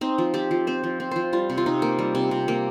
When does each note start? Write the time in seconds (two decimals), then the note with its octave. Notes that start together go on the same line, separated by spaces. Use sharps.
0.01 C4 D#4
0.18 F3
0.34 C4 G4
0.51 F3
0.67 C4 C5
0.83 F3
1.00 C4
1.11 F3 C5
1.33 G3 F4
1.50 C3
1.58 F4
1.66 C3 D#4
1.82 A#3
1.99 G3
2.15 C3
2.31 C3
2.48 A#3